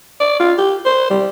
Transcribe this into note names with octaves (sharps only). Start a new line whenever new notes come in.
D5
F4
G4
C5
G3